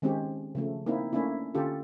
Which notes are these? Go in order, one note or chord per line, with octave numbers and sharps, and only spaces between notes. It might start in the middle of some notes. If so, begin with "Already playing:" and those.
D#3 G#3 C4 C#4 G4
C#3 F3 A3
A#3 C4 D#4 E4
A3 A#3 C#4 D4 E4
D3 C#4 F4 G4 A4